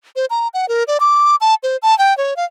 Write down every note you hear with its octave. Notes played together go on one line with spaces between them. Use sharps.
C5
A#5
F#5
A#4
D5
D6
A5
C5
A5
G5
C#5
F5